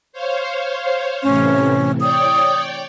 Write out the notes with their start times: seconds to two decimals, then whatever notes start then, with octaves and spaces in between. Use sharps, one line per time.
0.13 C5 C#5 F5
1.23 A2 C3 E3 C#4
2.01 C#5 D5 G5 D#6